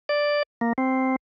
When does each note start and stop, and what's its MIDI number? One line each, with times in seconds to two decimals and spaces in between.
0.09 0.43 74
0.61 0.73 58
0.78 1.16 60